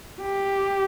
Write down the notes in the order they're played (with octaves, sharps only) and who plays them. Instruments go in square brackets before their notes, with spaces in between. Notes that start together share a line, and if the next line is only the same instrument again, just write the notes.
[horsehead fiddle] G4